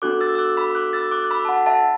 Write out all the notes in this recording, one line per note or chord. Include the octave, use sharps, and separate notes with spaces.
B3 D4 F#4 A4 D6 F#6
E6 A6
E6
D6 F#6
B5 E6
D6 F#6
E6 A6
D6 F#6
F#6
B5 E6
A5
F#5 B5
E5 A5